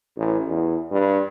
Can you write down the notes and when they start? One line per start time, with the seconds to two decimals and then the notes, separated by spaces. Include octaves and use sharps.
0.17 A1
0.48 E2
0.92 G2